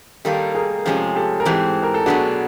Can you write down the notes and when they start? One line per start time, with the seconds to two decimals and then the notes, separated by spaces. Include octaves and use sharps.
0.25 D#3 G3 A#3 D#4 G4 A4
0.55 G#4 A#4
0.85 C3 F3 G#3 C#4 G4 A4
1.15 G4 A4
1.40 A#4
1.45 G#2 E3 G#3 C4 G4 A4
1.83 A#4
1.94 A4
2.06 B2 F#3 B3 D4 F#4 G#4